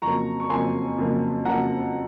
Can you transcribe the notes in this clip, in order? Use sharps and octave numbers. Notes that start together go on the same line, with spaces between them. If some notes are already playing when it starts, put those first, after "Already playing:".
F2 C#3 F#3 A#3 A#5 C#6
C#6
F2 C#3 F#3 A#3 G#5 C6
F2 C#3 F#3 A#3
F2 C#3 F#3 A#3 F#5 A#5